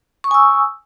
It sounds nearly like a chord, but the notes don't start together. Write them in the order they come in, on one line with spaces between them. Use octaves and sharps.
C#6 D#6 G#5 E6